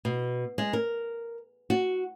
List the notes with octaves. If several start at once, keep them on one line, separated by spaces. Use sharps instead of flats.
B2
G#3
A#4
F#4